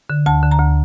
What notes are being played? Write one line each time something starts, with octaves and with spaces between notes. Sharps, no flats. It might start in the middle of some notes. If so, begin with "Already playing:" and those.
D3
D2 A5
D3
A#5
D2